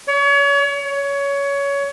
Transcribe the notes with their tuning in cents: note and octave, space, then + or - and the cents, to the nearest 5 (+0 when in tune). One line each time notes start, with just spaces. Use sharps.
C#5 +35
C#5 +20